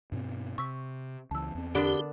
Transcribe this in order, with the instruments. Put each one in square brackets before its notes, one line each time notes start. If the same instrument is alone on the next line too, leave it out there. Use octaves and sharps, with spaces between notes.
[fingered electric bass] G2 B2 C4
[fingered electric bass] C3 [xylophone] C#6 E6 B6
[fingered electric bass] C#2 E3 [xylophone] A5 E6
[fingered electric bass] E2 C4
[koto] D3 B3 D4 [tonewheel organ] G4 [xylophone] A#4 D5